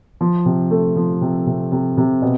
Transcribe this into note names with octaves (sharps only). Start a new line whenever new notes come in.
F3
C3
A3
F3
C3
C3
C3
C3
B2